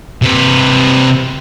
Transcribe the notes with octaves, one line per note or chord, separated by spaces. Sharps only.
C3 B4